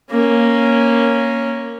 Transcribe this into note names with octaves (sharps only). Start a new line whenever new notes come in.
A#3 C#4